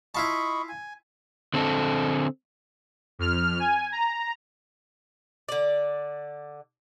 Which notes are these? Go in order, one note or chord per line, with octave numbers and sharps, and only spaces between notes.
E4 F4 D#5 A5 B5 C#6
G#5
D3 C4 A4
F2 F6
G#5
A#5
D3 D5